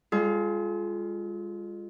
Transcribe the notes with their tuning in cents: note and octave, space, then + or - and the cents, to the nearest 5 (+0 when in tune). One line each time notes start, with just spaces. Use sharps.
G#3 -40 F4 +0 G#4 +45